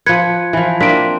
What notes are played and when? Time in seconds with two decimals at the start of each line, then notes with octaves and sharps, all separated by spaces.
0.06 F3 B4 G#6 C#7
0.53 E3 F3
0.81 A#3 C4 D4 B6 D7